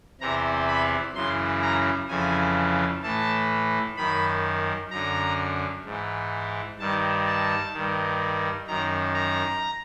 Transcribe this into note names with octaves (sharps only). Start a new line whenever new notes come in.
E2 C3 E3 A#5
B5
F#2 C#3 E3 C6
A#5
F2 C#3 E3 G#5
A2 E3 A5
F#2 D#3 B5
F#2 D3 A#5
G#2 E3
G2 D#3 A5
A5
G2 D#3
F#2 D#3 A#5
A#5